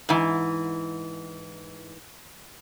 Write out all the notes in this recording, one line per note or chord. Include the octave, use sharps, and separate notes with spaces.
G#2 E3